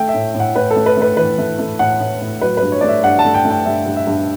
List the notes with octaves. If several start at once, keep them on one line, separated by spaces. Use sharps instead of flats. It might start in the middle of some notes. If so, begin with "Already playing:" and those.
Already playing: A3 G5
E5
A2
A2
F#5
A2 B4
A4
A3
B4
A3
B4
E3 B4
A3
A3
A2 F#5
A2
A2
F#3 B4
B4
G2
C#5
A3 D5
E5
G2 F#5
A5
A3
G5
A3
G5
G2 E5
G2
E5
G2